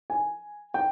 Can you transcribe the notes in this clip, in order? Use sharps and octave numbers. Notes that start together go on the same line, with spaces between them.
G#5
G5